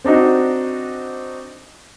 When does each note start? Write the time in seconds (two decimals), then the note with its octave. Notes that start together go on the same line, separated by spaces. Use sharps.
0.04 C4 D4 D#4 F#4